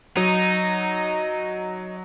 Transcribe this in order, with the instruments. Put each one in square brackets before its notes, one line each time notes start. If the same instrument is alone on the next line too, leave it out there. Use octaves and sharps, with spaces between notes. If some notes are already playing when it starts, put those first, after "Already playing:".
[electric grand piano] F#3 [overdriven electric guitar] D#4